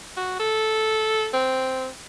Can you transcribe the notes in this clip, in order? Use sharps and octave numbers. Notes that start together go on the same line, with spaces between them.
F#4
A4
C4